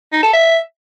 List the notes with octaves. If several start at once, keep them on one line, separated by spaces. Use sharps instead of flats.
D#4
A4
E5